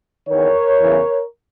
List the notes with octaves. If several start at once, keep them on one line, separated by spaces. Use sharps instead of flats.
E2 D#3 A#4 C#5
E2 C#3 E3